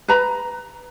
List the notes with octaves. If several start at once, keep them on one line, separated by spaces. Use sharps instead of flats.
B4 A#5 B5